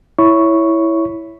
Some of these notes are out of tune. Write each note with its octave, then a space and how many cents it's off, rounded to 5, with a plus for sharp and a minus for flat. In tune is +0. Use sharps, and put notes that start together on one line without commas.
E4 +0 C#5 +10 C#6 +0